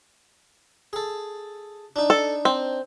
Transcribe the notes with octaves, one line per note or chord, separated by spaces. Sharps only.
G#4 A4
D4 D#4
A4
C4